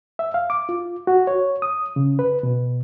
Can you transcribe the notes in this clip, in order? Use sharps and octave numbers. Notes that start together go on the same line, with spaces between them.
E5
F5
D6
F4
F#4
C#5
D#6
C#3
B4
B2